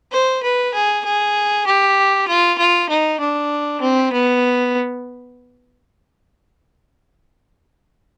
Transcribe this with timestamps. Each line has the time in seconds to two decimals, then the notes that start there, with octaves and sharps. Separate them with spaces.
0.12 C5
0.43 B4
0.74 G#4
1.05 G#4
1.67 G4
2.28 F4
2.58 F4
2.89 D#4
3.20 D4
3.81 C4
4.12 B3